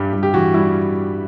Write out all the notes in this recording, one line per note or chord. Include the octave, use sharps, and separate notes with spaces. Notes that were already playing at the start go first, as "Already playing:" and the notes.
Already playing: G2 G3 G4
G2
G4
E3 F#4
G3 E4